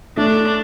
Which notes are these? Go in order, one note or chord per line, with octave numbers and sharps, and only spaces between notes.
A3 D4